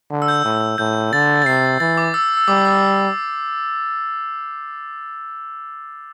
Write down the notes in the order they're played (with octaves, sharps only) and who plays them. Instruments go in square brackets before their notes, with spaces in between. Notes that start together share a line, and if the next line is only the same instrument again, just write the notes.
[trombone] D3
[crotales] E6
G6
[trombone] A2
[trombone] A2 [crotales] G6
[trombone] D3 [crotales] A6
[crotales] A6
[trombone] C3 [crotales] C7
[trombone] E3 [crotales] A6
[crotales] D6
E6
E6
[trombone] G3 [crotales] D6
[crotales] E6